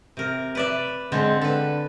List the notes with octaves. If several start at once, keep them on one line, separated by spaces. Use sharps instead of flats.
C3 A#4
B4 D5 E5
D3 G#3 C4 A4
D3 A4 B4